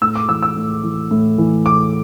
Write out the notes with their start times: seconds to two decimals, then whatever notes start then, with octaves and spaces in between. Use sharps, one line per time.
0.01 A2 E6
0.16 D6
0.29 E3 E6
0.42 E6
0.56 A2
0.84 E3
1.11 A2
1.38 E3
1.66 A2 D6